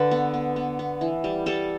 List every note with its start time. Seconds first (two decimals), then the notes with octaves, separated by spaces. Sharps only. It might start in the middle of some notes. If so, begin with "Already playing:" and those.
Already playing: D3 A4 B4
0.11 B3
0.34 B3
0.56 B3
0.79 B3
1.01 E3
1.24 G3
1.46 G3 A4